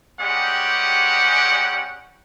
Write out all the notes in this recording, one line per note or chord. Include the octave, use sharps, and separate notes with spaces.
G3 G#3 C#4 G4 F#5 G5